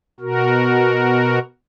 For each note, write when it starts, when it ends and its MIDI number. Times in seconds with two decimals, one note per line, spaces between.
0.20 1.39 47
0.20 1.39 66
0.20 1.39 70